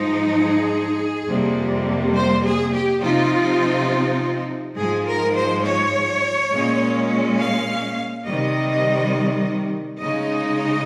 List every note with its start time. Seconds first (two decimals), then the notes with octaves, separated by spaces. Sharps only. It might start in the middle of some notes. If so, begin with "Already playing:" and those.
Already playing: G#2 F3 G#3 D#4
0.41 G#4
1.27 F2 C3 G3 A#3
2.14 C5
2.45 G#4
2.73 G4
3.02 C3 F3 C4 D#4 F4
4.77 G#2 F3 G#3 G#4
5.06 A#4
5.35 C5
5.64 C#5
6.52 A#2 G#3 C#4
7.38 F5
8.25 C3 D#3 G3 D#5
10.00 C#3 G#3 D#4 D#5